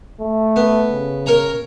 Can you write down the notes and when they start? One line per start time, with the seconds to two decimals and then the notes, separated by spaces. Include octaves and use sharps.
0.20 A3
0.56 B3
0.92 C#3
1.26 A#4 C#5 A#5